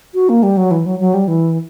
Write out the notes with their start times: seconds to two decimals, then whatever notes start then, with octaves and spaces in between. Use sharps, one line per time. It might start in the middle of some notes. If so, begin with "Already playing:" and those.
0.14 F#4
0.29 A#3
0.43 G3
0.57 F#3
0.71 E3
0.86 F#3
1.00 F#3
1.14 G3
1.28 E3